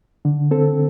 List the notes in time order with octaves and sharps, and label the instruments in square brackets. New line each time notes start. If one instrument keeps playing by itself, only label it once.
[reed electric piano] D3
C4 A4